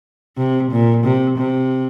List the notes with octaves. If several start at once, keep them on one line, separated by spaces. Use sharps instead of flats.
C3
A#2
C3
C3